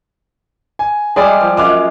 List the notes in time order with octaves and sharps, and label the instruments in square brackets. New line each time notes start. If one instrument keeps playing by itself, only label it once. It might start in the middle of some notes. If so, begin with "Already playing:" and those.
[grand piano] G#5
[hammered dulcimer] G3 G#3 [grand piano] G#4 D5
[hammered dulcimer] F3
[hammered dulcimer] F#2 G#3 F5 [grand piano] D6